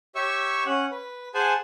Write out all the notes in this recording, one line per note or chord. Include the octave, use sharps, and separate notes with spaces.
G4 C#5 E5 C#6 E6
C#4 F#5
B4
G#4 C5 F#5 G#5 A5